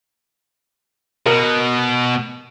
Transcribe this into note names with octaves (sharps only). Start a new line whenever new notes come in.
B2 A#4